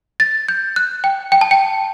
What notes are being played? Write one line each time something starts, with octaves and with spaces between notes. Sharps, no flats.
A6
G6
F#6
G5
G5
A5
G5